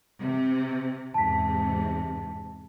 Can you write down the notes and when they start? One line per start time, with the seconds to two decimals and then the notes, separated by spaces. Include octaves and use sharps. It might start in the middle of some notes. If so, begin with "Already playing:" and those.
0.20 C3
1.14 E2 G#2 C3 A5 B6